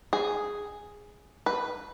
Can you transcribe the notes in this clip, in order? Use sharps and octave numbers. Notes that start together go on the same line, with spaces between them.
G#4
B4